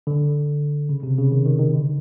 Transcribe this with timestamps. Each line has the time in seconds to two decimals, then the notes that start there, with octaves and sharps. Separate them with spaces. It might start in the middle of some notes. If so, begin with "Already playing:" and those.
0.07 D3
0.89 C#3
1.03 C3
1.18 C#3
1.32 D#3
1.46 D#3
1.59 D#3
1.74 D3